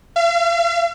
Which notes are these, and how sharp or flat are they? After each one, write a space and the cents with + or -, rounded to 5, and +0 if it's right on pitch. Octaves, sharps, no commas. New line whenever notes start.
F5 -40